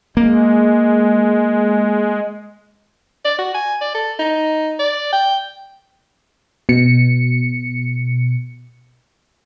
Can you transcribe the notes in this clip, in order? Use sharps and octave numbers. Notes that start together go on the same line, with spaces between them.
G#3 A#3
D5
F#4
G#5
D5
A4
D#4
D5
G5
B2 C#7